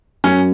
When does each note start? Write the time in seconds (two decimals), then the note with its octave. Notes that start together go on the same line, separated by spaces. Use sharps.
0.24 F#2 C#4